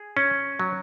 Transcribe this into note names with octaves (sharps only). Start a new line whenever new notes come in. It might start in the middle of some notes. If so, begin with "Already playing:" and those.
Already playing: G#4
C#4
F#3